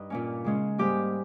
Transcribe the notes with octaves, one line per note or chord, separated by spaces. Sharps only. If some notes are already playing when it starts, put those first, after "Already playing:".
Already playing: G2 D#4
A#2 A#3 C#4
C#3 G#3 C#4
G#2 G3 A#3 G4